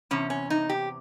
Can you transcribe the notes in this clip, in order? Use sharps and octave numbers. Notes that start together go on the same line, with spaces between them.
E2 C3 C#4
C#4
D#4
G4